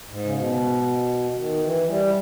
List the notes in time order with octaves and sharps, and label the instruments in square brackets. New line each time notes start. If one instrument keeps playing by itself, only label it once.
[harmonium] G#2
C#3
B2
D#3
E3
G3